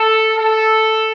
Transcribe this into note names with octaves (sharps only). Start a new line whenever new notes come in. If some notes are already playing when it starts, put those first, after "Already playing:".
Already playing: A4
A4